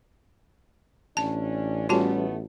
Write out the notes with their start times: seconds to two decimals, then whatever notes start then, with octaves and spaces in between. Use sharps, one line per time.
1.17 A1 C#4 D4 A5
1.89 E3 G3 A3 B3 C#4 F4 F#4 A5